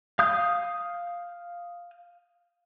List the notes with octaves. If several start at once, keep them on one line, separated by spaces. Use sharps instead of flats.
F5 D#6 G6